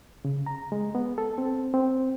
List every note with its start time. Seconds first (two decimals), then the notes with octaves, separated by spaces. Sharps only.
0.25 C#3
0.46 A#5
0.72 G#3
0.95 B3
1.18 A4
1.38 C4
1.74 C4